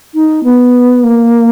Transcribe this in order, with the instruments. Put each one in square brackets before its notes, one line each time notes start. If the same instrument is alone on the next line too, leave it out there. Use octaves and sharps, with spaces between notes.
[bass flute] D#4
B3
A#3